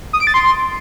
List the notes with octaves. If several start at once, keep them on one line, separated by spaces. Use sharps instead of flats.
D#6
D7
A6
C6